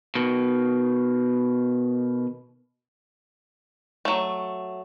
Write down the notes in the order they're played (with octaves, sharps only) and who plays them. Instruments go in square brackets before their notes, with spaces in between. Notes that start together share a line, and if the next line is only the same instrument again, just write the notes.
[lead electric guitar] B2 D#3
[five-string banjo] F#3 A3